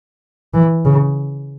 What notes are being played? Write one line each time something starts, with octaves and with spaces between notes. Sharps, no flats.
E3
C#3